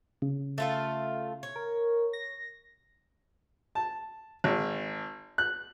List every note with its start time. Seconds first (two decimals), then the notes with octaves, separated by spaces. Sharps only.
0.22 C#3
0.58 A3 F4 A4
1.43 C#5
1.56 A#4
2.13 A#6
3.75 A5
4.44 G#1
5.38 F#6